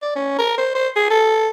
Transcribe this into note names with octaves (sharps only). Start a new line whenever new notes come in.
D5
C#4
A#4
C5
C5
G#4
A4